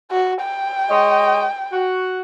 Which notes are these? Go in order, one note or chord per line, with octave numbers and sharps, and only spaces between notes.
F#4
G5
G#3 C#5 D#5
F#4